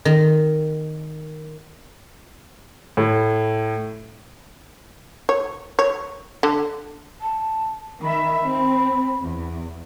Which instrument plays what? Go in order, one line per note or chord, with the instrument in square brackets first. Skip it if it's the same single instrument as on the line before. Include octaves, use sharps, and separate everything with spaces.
[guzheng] D#3
[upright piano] A2
[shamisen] C#5
C#5
D3
[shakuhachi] A5
[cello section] D#3 E5 [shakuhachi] B5
[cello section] C4
E2